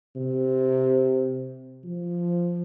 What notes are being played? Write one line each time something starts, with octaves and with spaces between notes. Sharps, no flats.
C3
F3